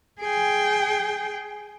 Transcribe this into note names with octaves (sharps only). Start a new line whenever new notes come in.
G#4 G5